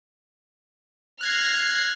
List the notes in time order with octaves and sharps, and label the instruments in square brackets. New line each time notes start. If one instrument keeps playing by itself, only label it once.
[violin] F6 A#6 [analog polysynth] F#6 G#6 C7